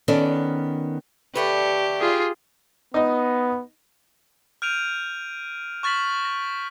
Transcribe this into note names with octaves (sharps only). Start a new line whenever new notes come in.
D#3 B3 C#4 A4 D5
D3 A3 G4 B4
F4 G#4
B3 D#4 D#5
F6 G6 D7 D#7 F7
C#6 F6 A6 B6 F#7
A#6